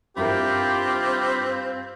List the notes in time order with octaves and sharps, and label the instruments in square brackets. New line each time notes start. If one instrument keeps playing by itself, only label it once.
[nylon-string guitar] G2 E4 A#4 [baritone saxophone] C4 [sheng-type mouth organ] F4 B5 [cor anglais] G4